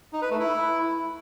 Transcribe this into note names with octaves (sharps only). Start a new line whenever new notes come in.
D#4
B4
A3
E4